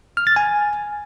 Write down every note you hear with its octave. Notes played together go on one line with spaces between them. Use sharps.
F6
A6
G#5